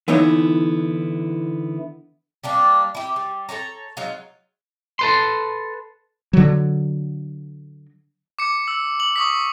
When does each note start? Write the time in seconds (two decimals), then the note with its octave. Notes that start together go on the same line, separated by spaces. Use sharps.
0.08 D3 E3 B3 D#4 E4 C#5
2.44 G3 A#3 D4
2.95 E4 G4
3.16 G3
3.49 A4 A#4 C#5 A#5
3.97 F#3 G#3 D#4 F4
4.99 A4 B4 C6
6.33 D3 F#3
8.39 D6 C#7
8.68 E6
9.00 F#7
9.16 C#6 D#6 B6